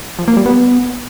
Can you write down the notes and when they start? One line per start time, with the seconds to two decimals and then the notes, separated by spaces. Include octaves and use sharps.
0.19 F3
0.28 A#3
0.37 G3
0.46 B3